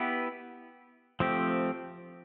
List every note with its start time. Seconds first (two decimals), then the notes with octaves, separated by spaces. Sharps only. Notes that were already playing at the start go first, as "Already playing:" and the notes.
Already playing: B3 E4 G4 B4
1.20 F3 A3 C4 G4